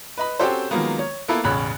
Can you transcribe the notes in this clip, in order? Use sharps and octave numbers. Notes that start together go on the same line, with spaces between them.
B4 D#5 B5
C4 C#4 F#4 G4 A4 C5
D#3 F3 F#3 G#3 A#3 B3
C#5
A#3 B3 E4 A4 B4
E1 A1 C#3 C#5 B5 F#6